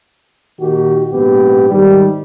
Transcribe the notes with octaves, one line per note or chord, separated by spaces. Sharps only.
A#2 D#3 F#4 G4
A#1 G#2 B3 G4
G#2 D#3 G3